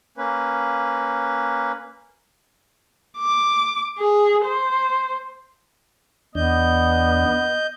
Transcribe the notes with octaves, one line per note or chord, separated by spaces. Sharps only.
A#3 C#4 B4
D6
G#4
C5
E2 B3 D4 D#5 G6